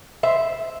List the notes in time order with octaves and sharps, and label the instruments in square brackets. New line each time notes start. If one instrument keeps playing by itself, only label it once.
[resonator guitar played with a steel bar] C5 E5